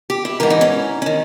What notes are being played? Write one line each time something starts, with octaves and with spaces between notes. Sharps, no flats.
G4
E4
G#2 E3 A#4
D#4
C#4
D#3 C#4